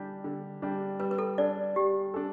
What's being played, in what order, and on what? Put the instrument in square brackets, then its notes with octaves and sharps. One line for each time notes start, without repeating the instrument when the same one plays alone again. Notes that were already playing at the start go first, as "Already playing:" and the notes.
Already playing: [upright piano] D3 G3 D4 G4
D3
G3 D4 G4
[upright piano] G3 [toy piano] B4
[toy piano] B4
A4
[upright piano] D4 A4 [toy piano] D5
[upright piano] G3 [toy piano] G4
[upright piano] D4 A4